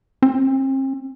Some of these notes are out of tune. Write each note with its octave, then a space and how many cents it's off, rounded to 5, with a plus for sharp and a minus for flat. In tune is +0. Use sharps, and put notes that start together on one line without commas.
C4 +40